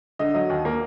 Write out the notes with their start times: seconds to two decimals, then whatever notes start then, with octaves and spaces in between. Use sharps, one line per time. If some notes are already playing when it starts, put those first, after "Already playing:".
0.19 D3 D#5
0.34 F#3 D#5
0.50 D#2
0.65 A#3